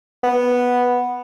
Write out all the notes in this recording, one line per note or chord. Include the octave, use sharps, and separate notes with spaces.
B3